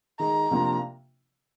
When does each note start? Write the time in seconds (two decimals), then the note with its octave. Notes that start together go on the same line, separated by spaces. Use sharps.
0.20 D#3 G#3 D#4 A#5
0.51 C3 F3 A#3 D4 F4